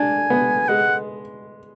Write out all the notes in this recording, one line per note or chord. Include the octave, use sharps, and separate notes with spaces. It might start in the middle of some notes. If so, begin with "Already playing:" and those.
Already playing: D4 G#5
B3
G#3 F#5